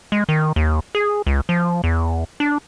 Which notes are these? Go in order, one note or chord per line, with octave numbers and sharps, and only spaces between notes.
G#3
D#3
D#2
G#4
C#2
F3
E2
D4